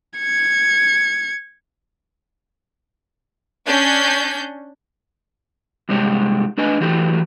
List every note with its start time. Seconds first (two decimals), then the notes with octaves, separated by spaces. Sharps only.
0.20 G#6 C#7
3.66 C#4 D4 G6
5.89 G2 C3 G#3 G4 C#5
6.57 A3 D4 B4 D#5 G#5
6.81 E3 F#3 A3 G4